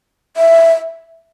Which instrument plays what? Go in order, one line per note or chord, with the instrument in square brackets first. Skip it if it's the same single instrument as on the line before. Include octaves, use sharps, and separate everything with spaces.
[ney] E5